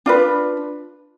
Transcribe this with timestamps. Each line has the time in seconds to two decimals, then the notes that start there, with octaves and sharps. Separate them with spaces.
0.06 D4 F4 B4